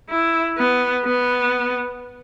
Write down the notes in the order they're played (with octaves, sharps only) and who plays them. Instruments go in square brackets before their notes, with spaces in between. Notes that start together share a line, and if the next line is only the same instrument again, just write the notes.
[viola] E4
B3
B3